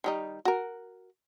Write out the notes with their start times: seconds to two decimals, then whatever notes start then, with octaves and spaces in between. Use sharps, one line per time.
0.04 D#3 G3 D#4
0.45 F#4 A#4